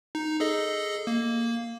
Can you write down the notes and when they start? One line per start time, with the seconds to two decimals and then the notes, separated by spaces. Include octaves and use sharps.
0.15 D#4
0.40 G#4 A4 D#5
1.07 A#3